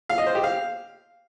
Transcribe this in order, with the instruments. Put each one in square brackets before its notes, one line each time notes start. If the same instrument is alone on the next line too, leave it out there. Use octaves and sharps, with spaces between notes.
[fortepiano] F5
D#5
C5
G4
F5